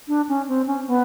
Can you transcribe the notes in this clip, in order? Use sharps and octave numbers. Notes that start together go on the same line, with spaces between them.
D4
C#4
C4
C#4
B3